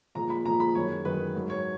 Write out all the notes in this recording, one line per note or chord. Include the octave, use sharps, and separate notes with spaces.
A#2 F3 G#3 A#5
B5
A#2 F3 G#3 A#5
B5
F#2 D#3 G#3 C#5
F#2 D#3 G#3 B4
G#2 F#3
C#5